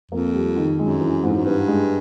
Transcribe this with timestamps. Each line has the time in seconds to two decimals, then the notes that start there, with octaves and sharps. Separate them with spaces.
0.11 F2 A#3
0.34 G3
0.56 D#3
0.79 F#2 G#3
1.01 E3
1.23 F2 G#2
1.36 F#2
1.45 G2 B3
1.68 G#3